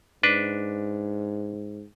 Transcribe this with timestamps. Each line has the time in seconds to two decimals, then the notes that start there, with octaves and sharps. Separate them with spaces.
0.23 G#2 D4 B4